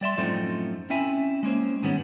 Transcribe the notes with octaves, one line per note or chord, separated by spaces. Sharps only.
G3 D5 E5 C6
F#2 A2 F3 A3 C4 D#4
C4 C#4 E4 E5 G#5
G#3 A#3 C#4 C5
G#2 D#3 G3 B3 C#4